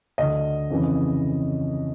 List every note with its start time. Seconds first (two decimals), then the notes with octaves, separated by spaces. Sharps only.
0.18 D2 D3 D#5
0.70 F2 C#3 E3